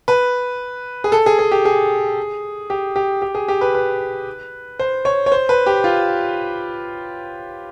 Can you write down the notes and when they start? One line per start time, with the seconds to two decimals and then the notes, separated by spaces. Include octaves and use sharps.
0.08 B4
1.04 G#4
1.12 A4
1.26 G#4
1.39 G#4
1.51 G4
1.65 G#4
2.70 G4
2.96 G4
3.22 G4
3.35 G#4
3.48 G4
3.61 B4
3.74 B4
4.79 C5
5.05 C#5
5.26 C#5
5.32 C5
5.49 B4
5.66 G4
5.84 F4